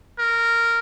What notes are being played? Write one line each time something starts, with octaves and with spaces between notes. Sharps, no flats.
A#4